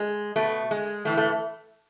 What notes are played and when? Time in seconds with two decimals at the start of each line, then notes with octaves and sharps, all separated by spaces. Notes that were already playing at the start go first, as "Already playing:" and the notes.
Already playing: G#3
0.36 B2 A3
0.71 G#3
1.05 A2 E3 A3
1.17 A3